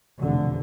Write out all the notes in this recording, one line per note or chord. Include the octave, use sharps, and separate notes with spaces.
F1 E2 B2 D3